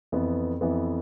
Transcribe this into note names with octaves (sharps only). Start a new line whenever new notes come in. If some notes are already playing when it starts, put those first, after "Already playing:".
F2 E3 B3
F2 E3 B3